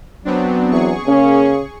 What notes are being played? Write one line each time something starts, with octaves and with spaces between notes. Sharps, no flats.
F#3 B3 C4 D4
E2 G#4 C#6
C#3 A#3 C#4